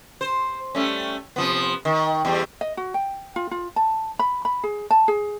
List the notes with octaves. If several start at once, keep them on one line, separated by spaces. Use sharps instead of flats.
C5
G3 A3 C#4
C3 F3 B3
D#3
E2 G3
D#5
F#4
G5
F4
F4
A5
B5
B5
G#4
A5
G#4